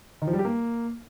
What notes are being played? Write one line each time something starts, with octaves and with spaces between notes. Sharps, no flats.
D#3
F3
G3
G4
A#3